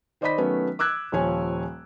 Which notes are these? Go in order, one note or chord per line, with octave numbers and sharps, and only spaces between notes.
D#3 C5 D5 D#5 B5 B6
D#3 F#3 A3 B3 C#4
D6 E6 F#6 G#6
D#1 F3 C#5 G#5